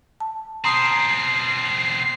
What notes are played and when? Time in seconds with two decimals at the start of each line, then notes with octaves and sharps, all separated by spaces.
0.20 A5
0.64 B2 C4 A#5 C6 D#6 G6 C7